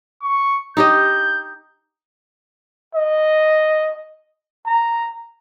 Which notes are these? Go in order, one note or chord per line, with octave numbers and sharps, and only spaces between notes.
C#6
D#4 G4 D#5 G6
D#5
A#5